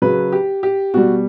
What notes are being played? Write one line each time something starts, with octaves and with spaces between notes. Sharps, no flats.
C#3 F#3 B4
G4
G4
B2 G3 F#4